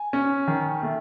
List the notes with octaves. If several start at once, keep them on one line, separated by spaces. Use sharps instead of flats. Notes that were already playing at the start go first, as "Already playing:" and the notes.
Already playing: G#5
C#4
D#3
A3